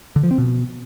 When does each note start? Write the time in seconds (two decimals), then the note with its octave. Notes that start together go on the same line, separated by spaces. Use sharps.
0.16 D3
0.23 F3
0.31 C4
0.38 B2